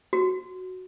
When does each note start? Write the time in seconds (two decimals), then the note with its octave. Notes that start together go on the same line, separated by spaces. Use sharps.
0.13 F#4